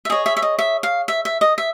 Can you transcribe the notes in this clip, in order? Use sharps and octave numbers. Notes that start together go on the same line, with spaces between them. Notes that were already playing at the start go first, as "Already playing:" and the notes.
E5
G#4 C#5 D#5
E5
E5
D#5
E5
F5
E5
E5
D#5
E5